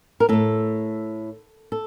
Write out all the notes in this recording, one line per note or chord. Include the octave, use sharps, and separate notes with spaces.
A#4
A2 A3 A4
A4